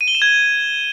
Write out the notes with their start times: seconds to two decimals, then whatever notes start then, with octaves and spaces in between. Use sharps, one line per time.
0.01 D#7
0.08 G7
0.15 E7
0.22 G#6